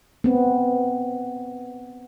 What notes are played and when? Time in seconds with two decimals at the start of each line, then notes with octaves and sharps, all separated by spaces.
0.24 B3 C4